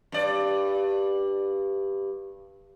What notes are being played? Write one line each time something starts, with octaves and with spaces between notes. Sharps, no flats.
G2 D5